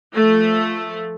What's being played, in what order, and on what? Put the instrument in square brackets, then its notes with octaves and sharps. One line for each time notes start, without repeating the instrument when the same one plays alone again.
[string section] F3 A3